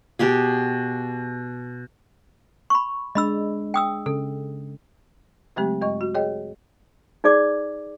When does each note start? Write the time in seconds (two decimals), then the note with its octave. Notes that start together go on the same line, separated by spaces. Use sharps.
0.19 B2 G4 G#4
2.70 B5 C#6
3.15 G#3 D4 D#5 B5 E6
3.74 G5 D#6 E6
4.06 C#3 A4
5.56 C#3 F#3 G#3 A3 C4 G4
5.81 G2 G#3 D#5 C#6
6.01 F#4
6.15 G#4 C#5 D#5 G5
7.24 D#4 G#4 D5 D6